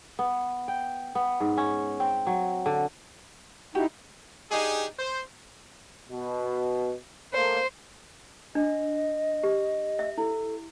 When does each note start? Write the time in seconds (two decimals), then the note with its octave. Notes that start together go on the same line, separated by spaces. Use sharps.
0.19 B3
0.68 G5
1.15 B3
1.40 G#2
1.58 C#4
2.00 C4
2.27 F#3
2.66 D3
3.75 D#4 E4 F#4 G4 E5
4.51 D4 D#4 G4 G#4
4.99 C5
6.10 B2
7.34 A3 A#3 C5
8.55 D4 D#5
9.43 G4
9.99 E5
10.18 E4 A4